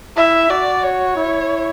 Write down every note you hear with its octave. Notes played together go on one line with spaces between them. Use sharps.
E4 E5
F#4 D5
C#5
E4